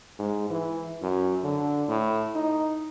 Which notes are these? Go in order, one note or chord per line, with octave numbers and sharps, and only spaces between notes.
G#2
E3
F#2
D3
A2
D#4